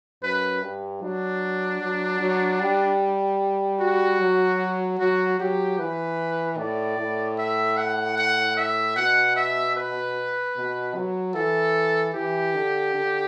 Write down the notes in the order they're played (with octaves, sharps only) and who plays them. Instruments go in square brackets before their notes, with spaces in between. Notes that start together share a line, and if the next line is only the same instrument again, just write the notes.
[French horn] F#2 [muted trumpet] B4
[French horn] G2
[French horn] F#3 [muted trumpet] D4
[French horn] F#3
F#3
G3
[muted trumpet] F#4
[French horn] F#3
[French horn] F#3 [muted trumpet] F#4
[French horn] F#3 [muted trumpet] G4
[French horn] E3 [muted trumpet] B4
[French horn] A2 [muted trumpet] D5
[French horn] A2
[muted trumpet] E5
F#5
F#5
E5
[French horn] B2 [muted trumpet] F#5
[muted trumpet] E5
B4
[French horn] B2
F#3
[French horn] E3 [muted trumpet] A4
[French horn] E3 [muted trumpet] G4
[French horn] D3
D3